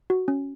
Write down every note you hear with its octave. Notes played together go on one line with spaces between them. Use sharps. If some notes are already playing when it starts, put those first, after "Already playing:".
F#4
C#4